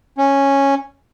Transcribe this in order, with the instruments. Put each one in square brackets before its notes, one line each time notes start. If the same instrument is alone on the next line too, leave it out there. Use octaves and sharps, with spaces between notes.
[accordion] C#4